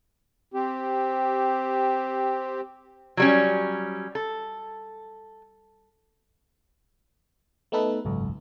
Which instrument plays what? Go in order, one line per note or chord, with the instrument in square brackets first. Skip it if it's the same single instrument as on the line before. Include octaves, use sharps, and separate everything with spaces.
[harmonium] C4 G4
[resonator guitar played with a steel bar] F#3 G3 C#4
A4
[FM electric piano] A3 B3 D#4 A4 B4
G#1 C#2 F#2